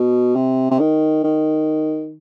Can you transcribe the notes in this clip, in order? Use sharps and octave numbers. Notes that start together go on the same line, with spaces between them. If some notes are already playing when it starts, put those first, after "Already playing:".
Already playing: B2
C3
C3
D#3
D#3